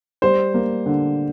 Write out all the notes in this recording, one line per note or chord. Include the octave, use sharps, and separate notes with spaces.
G3 C5
A#3
D3